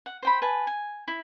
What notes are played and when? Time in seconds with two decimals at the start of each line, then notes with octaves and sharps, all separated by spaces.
0.06 F#5
0.23 C5 G5 B5
0.42 B4 G#5 A5
0.67 G#5
1.08 E4